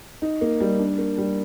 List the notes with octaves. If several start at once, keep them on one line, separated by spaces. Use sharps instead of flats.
D#4
A#3
G3
D4
A#3
G3